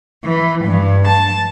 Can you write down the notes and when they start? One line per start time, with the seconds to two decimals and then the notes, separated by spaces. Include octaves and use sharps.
0.24 E3
0.65 G2
1.07 A5